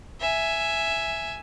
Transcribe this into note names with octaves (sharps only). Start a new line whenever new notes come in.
E5 G#5